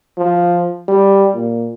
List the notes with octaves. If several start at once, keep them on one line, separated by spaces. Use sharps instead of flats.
F3
G3
A#2